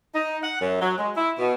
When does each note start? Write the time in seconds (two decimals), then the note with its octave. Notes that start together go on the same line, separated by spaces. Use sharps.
0.15 D#4
0.43 F#5
0.61 F#2
0.81 F#3
0.99 G#3
1.17 E4
1.38 B2